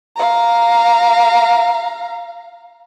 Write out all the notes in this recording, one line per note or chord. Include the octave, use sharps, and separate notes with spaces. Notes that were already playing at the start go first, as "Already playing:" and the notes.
F5 A#5